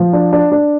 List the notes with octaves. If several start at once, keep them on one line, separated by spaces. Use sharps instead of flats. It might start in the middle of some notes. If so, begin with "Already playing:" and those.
Already playing: F3
D4
D4
D4